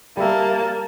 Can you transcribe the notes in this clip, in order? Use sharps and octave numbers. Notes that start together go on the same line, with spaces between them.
G3 A#3 E5 A5